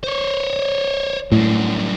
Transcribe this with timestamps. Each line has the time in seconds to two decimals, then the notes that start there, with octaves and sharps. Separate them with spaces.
0.04 C5 C#5
1.32 F#2 A2 G3